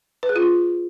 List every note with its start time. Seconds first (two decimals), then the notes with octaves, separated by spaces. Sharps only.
0.23 B4
0.29 G#4
0.36 F4